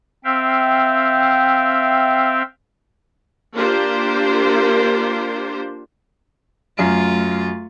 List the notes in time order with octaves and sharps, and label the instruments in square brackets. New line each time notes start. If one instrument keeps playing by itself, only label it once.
[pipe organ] C4 E5 F5 G5
[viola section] A#3 D4 F4 G4 A#4 C5
[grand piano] F#2 [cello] A3 F4